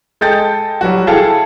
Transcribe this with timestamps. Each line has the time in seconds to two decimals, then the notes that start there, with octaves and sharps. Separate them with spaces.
0.21 G#3 A4 D#5 G5 G6 A6
0.81 F#3 G3 F#4
1.07 E4 G#4 A4 F5 G5 A5